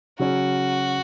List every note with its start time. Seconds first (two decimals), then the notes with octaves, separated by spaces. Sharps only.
0.19 C#3 F#3 C#4 F#4